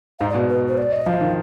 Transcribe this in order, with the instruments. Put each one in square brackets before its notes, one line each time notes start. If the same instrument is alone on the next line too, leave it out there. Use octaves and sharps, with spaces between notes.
[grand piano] G#2 [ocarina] F5
[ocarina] D5
[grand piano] B2
[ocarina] B4
C5
D5
D#5
[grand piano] F3 [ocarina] F5
[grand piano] D#3